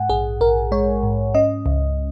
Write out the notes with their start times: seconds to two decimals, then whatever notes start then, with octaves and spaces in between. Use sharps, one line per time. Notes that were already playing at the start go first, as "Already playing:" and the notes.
Already playing: G#2 F#5 G#5
0.09 A#1 G#4
0.40 A#1 A#4
0.72 G#3 C#5
1.03 G#2
1.35 C#4 D#5
1.66 C#2